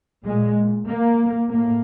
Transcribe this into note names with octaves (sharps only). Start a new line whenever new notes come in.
A#2 G#3
A#3
A2 A#3